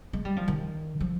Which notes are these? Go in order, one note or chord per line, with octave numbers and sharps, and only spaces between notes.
G#3
G3
F3
D#3
F3